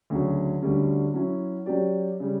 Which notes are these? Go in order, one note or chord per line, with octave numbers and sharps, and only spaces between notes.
D2 C#3 F#3
D2 D3 G3 C#4
F#3 C#4 E4
F#3 C#4 G4 D5
C#3 G3